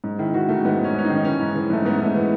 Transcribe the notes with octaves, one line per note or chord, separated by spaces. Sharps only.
G#2
D#3 E4
D#3 F#4
D#3 A3
G#2 B3
G#2
C#4
G#2 C#4
D#4
D#3
D#4
E3 C#4
G#2
E3
G#2 A3
G#2 B3
G#2 A3
E3 B3